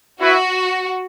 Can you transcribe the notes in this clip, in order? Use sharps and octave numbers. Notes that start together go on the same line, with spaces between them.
E4 F#4 B4 E5